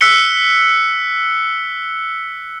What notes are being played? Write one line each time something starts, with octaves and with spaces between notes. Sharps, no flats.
E6 F#6 B6 C#7 G7